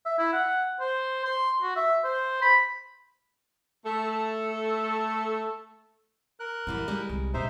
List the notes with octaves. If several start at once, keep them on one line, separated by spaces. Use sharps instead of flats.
E5
E4
F#5
C5
C6
F#4
E5
C5
B5
A3 A4
A#4 F#6
F#2 C#3 E3 G3
G3 G#3
C2
B2 C#4 D#4 C5 E5